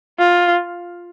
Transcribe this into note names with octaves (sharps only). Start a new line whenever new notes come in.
F4